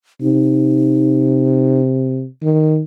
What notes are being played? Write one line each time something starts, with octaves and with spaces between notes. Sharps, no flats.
C3 D#4
D#3